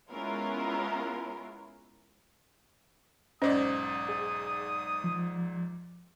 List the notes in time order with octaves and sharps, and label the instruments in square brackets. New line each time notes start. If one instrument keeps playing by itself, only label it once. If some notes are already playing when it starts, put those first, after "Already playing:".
[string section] G#3 B3 C#4 E4 F4 A#4
[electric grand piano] B1 G#2 D5 [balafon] C#4 C5 D#5 [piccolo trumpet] D#6
[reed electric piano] G#4
F3